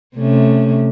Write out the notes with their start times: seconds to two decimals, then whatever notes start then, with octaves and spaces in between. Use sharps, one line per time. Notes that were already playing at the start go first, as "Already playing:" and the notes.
0.16 C3 A3 C#4